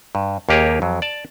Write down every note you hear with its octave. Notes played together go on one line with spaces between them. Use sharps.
G2
D#2 A#3 G4 G#4 A#4 C#5
F2 F#3
D5 A5